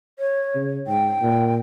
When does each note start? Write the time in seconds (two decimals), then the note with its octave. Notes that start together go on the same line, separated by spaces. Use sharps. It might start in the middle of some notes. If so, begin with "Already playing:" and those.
0.19 C#5
0.55 C#3
0.87 G#2 G5
1.22 A#2